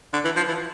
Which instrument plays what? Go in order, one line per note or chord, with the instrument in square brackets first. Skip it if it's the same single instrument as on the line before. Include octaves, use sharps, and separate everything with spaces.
[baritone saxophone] D3
E3
F3
E3